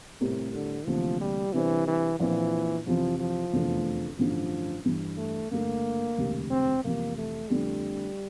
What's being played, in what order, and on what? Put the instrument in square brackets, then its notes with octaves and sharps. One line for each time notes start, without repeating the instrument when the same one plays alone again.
[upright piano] A2 G3 C4 G4 A#4 [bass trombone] C3
[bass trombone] D3
[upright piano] D2 C3 E3 A#3 [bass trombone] F3
[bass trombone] G3
[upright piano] C3 G3 D4 G4 C5 [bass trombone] E3
[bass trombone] E3
[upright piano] A#1 A#2 F3 C4 [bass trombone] E3
[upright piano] F2 C3 E3 [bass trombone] F3
[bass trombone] F3
[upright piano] F1 E2 D3 A3
[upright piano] A1 G2 D3 [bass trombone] F3
[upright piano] G2 E3 G3
[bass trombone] A3
[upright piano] G2 D3 A3 [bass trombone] A#3
[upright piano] E1 D2 C3 G3
[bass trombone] C4
[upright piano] F1 F2 E3 G3 [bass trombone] A#3
[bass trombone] A3
[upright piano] F2 D3 A3 [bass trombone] G3